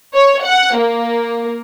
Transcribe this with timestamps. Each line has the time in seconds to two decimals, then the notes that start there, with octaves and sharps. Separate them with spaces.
0.15 C#5
0.44 F#5
0.77 A#3